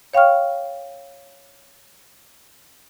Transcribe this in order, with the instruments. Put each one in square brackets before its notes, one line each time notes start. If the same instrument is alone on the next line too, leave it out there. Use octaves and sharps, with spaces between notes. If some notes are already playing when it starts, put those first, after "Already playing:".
[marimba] C#5 F5 G5 C#6 F6